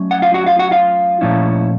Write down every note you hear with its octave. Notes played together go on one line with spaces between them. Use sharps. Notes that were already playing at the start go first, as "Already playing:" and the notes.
Already playing: F#3 A3 C#4
F#5
F4 F5
F#4 F#5
F4 F5
F#4 F#5
F4 F5
A#2 F3 A3 C#4 E4